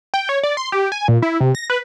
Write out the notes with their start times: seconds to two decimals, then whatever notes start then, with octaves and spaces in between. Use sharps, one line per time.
0.14 G5
0.29 C#5
0.43 D5
0.57 C6
0.72 G4
0.92 G#5
1.08 A#2
1.22 E4
1.40 C3
1.55 A#6
1.70 B4